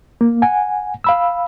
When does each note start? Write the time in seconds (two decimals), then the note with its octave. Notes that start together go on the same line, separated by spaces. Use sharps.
0.21 A#3
0.42 F#5 G#5
1.04 F5 B5 E6